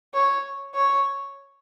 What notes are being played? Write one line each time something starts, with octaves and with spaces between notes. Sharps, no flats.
C#5
C#5